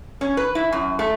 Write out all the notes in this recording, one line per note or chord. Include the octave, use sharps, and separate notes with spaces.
C#4
B4
E4
F#2
A3